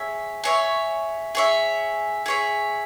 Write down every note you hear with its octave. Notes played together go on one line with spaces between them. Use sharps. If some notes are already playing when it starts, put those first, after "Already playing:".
Already playing: G#4 C#5 E5
G#4 C#5 E5
G#4 C#5 E5
G#4 C#5 E5